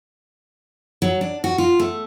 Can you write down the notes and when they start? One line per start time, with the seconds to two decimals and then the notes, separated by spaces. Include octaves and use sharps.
1.02 F#3
1.21 D4
1.44 F#4
1.58 F4
1.80 A3